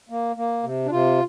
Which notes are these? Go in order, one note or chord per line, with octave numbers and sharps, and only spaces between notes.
A#3
A#3
C3
D4
C3 F4